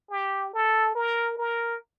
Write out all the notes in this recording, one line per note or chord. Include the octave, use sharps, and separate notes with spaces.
G4
A4
A#4
A#4